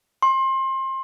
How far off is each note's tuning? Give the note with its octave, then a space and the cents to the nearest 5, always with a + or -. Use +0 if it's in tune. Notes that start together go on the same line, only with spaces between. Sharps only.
C6 +30